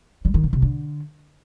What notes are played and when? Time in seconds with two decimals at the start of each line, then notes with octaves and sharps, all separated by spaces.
0.25 G3
0.34 D#3
0.43 B2
0.53 C3
0.62 D3